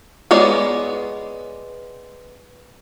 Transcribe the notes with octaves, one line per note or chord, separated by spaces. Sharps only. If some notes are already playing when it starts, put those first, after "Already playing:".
G#3 B3 C#5 D5